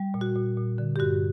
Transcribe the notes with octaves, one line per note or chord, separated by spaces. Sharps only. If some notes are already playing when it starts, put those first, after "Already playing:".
Already playing: G3
A#2
F#4
A#2
A#2
D3
G4
G2 F#4